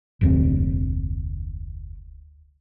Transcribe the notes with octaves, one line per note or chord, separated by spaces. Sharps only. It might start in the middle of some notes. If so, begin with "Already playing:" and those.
F1 D2 C4